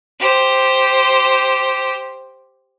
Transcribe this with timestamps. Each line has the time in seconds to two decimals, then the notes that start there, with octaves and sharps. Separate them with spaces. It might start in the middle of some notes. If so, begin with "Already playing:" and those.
0.19 G4 C5